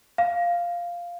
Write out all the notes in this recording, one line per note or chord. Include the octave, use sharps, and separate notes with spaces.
F5